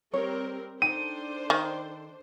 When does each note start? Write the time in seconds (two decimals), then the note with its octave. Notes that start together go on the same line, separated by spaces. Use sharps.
0.14 G3 C4 A#4 C#5
0.82 D4 D#4 A4 C5 G5 D#7
1.50 D#3